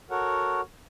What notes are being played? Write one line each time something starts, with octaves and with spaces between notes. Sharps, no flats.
F#4 A4 A#4 C#5 F#5